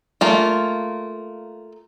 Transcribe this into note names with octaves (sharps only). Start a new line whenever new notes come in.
A3 A#3 F4